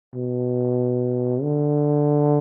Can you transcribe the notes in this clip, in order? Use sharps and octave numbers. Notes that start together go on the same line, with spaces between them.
B2
D3